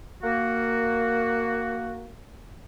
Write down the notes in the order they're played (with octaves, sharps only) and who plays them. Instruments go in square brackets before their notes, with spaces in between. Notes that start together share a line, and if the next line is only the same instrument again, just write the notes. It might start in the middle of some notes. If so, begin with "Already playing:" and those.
[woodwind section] A#3 F#4